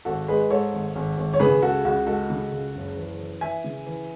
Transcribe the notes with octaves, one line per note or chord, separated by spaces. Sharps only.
G#1 F#4 A4
G#3 G#4 B4
G#2 A4 C#5
G#1
G#1
G#1
C#5
C#3 G#4 B4
C#2 F#4 A4
C#2 F#4
G#3 F#4 A4
C#3
C#2
F#1
E3
E3
E3 E5 G#5
C#3
E3